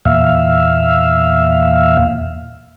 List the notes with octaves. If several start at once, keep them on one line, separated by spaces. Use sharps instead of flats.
E2 A#2 E5 F5